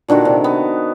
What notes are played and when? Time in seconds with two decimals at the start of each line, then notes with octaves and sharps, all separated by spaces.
0.08 A#2 D3 D#3 F#4
0.25 C3
0.44 B3